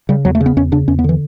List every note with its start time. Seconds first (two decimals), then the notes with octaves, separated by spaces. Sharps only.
0.09 C#3 G3
0.25 E2 F#3
0.35 A3
0.40 C#3
0.46 B3
0.57 E2 C#4
0.72 C#3 D4
0.88 E2 C#4
0.99 B3
1.04 D3 E3